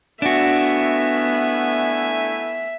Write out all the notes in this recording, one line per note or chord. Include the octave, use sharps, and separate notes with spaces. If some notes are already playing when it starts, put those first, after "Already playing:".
A3 B3 D4 E4 F#4 E5 G#5